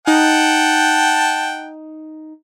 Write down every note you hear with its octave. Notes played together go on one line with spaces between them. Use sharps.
D#4 F#5 G5 A5